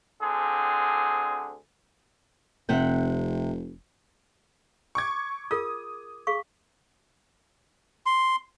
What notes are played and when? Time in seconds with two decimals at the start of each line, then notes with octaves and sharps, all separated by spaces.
0.22 D2 D3 C4 G#4
2.69 F1 C3 F#5 G5
4.95 C#6 D6 G#6
5.51 F4 G#4 A#4 D#6
6.27 G#4 F5 C#6
8.06 C6